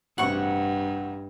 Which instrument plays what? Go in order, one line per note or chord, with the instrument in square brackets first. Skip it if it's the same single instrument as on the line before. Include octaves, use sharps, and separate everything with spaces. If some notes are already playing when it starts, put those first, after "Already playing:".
[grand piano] A1 C3 F#4 [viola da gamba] G2 [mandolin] F#5 C#6